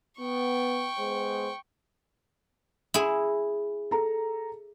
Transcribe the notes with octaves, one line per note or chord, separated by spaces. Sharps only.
B3 G5 C#6
G#3 B3 C5
E4 G#4
A4 A#5